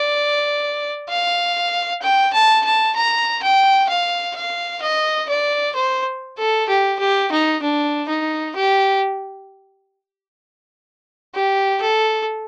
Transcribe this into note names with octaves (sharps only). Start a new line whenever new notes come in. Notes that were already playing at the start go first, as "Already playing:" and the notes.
Already playing: D5
F5
G5
A5
A5
A#5
G5
F5
F5
D#5
D5
C5
A4
G4
G4
D#4
D4
D#4
G4
G4
A4